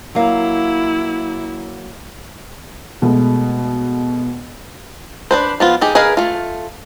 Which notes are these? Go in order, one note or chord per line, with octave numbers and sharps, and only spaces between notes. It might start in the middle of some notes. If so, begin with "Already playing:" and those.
F#3 A#3 E4 F5
B2 G#3 A3 F#4
D4 B4 C5
F3 B3 F4
D#4 G4 G#4
G#4 A#4 B4 D#5 F5
A3 F4